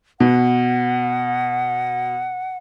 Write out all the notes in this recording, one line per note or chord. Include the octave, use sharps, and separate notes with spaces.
B2 F#5